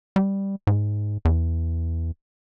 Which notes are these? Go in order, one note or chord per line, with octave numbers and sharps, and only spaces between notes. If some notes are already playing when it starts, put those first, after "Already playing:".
G3
G#2
E2